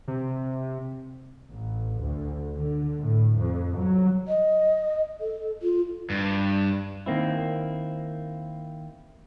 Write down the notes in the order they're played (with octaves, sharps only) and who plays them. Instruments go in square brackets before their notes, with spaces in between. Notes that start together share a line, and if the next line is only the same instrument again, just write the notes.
[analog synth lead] C3
[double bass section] A1
D2
D3
A2
F2
F#3
[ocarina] D#5
A4
F4
[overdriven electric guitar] G2
[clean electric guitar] D#3 A#3 C4 E4